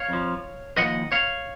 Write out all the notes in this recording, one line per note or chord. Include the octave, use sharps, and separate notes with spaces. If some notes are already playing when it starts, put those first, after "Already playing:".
Already playing: C#5 F5
F2 F3
D#2 C#3 F3 D#5 F#5
C#5 F5